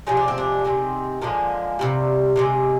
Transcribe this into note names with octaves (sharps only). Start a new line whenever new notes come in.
C3 F3 G#3 D#4
D4
C4
D4
C3 D#3 G#3 C4
D3 F3 G#3 A#3
C3 D#3 G3
C3 F3 G#3